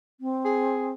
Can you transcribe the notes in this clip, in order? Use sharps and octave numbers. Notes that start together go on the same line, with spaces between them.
C4
G#4